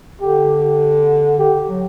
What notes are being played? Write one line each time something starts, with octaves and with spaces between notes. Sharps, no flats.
D3 G4
D3 G4
F#3